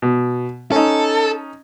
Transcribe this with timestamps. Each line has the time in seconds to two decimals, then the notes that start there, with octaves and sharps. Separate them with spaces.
0.02 B2
0.72 C#4 D#4 A4